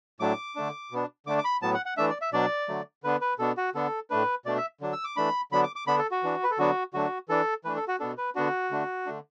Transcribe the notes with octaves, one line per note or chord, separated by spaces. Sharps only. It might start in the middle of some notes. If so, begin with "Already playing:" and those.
A2 F#3 A3 D4 D6
D3 A3 D4
B2 B3 D4
D3 A3 D4 D6
D6
B5
A2 F#3 B3 A5
F#5
F#5
E3 A3 D4 E5
D5
E5
B2 F#3 D4 D5
D3 F#3 A3
D3 B3 D4 B4
B4
B2 B3 D4 A4
F#4
D3 B3 D4 A4
A2 A3 D4 B4
B2 A3 D4 D5
E5
D3 F#3 D4
E6
D6
E3 A3 D4 B5
D3 F#3 B3 D4 B5
D6
D6
D3 B3 D4 B5
A4
F#4
E3 D4
B4
A4
D3 F#3 B3 D4 F#4
D3 F#3 A3 D4 F#4
E3 D4 A4
E3 A3 D4 B4
A4
F#4
B2 B3 D4 A4
B4
D3 B3 D4 F#4
D3 A3 D4
D3 A3 D4